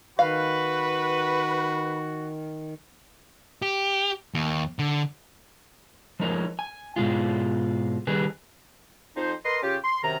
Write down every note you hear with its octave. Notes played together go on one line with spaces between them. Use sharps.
D#3 F#4 B4 F5
G4
D#2
D3
F3 G#3 A3 D#4 A#4 C#5
G#5
G#2 B2 G#3 F4
D#3 G3 D#4 G#4 B4
F2 D#4 C5
A#4 B4 D#5 C6
C#3 C#4 F4 G4
C6
F#2 C3 D#3 A#5